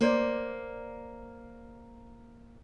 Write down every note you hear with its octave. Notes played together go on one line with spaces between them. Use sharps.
A#3 C5 D5